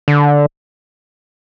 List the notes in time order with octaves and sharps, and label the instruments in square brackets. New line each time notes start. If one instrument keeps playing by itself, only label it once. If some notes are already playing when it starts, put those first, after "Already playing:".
[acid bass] D3